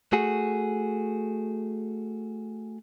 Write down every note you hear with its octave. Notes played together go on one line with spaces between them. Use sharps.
A3 F#4 G#4